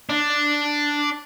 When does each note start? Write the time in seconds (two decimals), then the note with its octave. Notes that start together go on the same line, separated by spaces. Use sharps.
0.09 D4